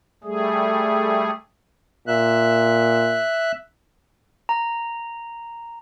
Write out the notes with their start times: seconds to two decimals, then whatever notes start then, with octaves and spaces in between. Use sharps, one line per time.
0.24 G3 A3 G#4
2.08 A#2 E5 F#6
4.49 A#5